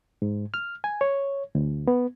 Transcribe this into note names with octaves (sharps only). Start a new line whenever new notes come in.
G#2
F6
G#5
C#5
D2
B3